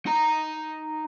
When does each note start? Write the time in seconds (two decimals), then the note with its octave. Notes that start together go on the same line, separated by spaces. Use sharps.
0.06 D#4 A#5